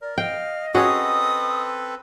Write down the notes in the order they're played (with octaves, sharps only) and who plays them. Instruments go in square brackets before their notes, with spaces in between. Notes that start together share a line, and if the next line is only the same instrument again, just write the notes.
[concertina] A#4 [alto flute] D5
[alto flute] D#5 [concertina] F5 [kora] G5
[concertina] C4 A4 B4 [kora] C#4 F#4 G#4 [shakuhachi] D#6